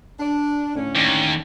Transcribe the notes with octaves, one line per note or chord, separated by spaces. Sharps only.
D4
A2 D3 C#4
D#2